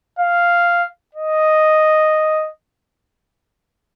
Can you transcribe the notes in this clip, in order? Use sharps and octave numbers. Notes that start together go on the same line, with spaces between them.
F5
D#5